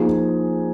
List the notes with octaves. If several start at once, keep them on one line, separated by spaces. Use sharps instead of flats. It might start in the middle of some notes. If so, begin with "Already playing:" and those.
Already playing: F3 A#3 D#4 G#4